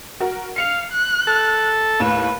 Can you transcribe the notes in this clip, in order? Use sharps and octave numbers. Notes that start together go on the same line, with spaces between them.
F#4 A#4
F5 C7 C#7 F7
F#6
A4
D#2 A2 B4 E7